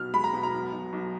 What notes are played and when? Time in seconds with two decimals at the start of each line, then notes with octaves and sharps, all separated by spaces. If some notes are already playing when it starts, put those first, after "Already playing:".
Already playing: B1 B2 F6
0.13 G#3 B5
0.24 A#5
0.33 B2
0.43 A#5
0.53 B1
0.72 B1
0.93 B1